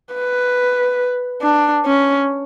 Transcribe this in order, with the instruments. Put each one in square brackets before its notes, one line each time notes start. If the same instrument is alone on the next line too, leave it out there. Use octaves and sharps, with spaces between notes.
[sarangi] B4
D4
C#4